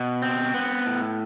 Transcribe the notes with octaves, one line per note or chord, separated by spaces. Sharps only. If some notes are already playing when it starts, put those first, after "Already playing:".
Already playing: B2
C4
B3
A2